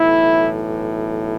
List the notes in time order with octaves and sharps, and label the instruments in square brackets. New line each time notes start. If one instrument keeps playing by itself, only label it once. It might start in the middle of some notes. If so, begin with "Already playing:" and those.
Already playing: [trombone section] B1 A2 E3 E4